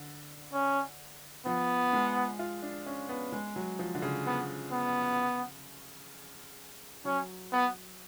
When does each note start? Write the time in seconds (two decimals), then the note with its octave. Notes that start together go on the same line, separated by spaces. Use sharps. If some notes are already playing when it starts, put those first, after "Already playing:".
Already playing: D3
0.53 C#4
1.46 F3 B3
1.93 G#3
2.39 F4
2.63 D4
2.86 C#4
3.09 B3
3.32 G#3
3.56 F#3
3.79 F3
3.95 D3
4.02 C#3
4.26 B3
4.72 B3
7.05 F#3 C#4
7.52 B3